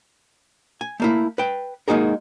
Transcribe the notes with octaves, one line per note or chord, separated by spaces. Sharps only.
G#5
A3 A#3 E4
B4 G5
G#3 A#3 D#4 F#4 G#4 A#4